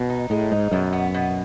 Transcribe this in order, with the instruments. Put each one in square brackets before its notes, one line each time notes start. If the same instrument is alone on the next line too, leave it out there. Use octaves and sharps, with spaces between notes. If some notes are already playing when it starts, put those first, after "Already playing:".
Already playing: [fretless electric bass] B2
[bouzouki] D#4
[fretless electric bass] A2 [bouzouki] G#3
[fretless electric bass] G#2 [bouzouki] D#4
[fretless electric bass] F#2 [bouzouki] B2
[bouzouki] B3
B2